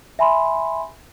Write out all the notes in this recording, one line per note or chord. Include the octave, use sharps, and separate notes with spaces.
E5 G#5 B5 C6